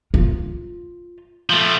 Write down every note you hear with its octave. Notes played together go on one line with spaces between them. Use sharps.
F4
F3 A3